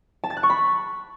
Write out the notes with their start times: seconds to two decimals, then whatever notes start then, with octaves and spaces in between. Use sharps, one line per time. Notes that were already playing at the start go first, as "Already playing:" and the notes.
0.24 A5
0.30 A6
0.37 F#6
0.43 C#6
0.50 B5